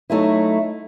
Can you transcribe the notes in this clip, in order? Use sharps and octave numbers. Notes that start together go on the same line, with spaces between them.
F#3 A3 D#4 E4